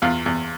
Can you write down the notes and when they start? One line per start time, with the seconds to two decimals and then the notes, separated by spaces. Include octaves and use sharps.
0.02 E2 F4 F5
0.26 E2